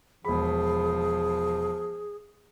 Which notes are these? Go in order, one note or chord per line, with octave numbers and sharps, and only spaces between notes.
E1 F3 G#4 B5